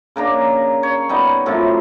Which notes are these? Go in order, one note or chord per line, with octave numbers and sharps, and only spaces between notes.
C#3 A#3 D4 A#5
C#5
G3 B3 D#4
F#2 A2 C3 F3